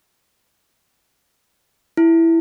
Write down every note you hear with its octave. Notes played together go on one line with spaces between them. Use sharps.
E4